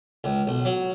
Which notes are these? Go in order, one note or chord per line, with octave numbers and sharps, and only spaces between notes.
C#2
B1
F#3